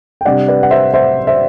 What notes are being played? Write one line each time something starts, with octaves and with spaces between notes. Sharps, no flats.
G5
C3 G3 D4 D5 F#5
B4 D5
F#5
C5 E5
C5 E5
C5 E5